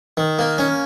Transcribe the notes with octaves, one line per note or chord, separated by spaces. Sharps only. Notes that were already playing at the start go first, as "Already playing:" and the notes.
D#3
A#3
C#4